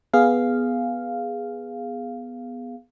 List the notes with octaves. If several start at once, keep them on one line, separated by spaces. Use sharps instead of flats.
B3 G#4 F5